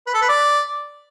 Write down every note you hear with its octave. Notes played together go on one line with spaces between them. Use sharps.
B4
A4
B4
D5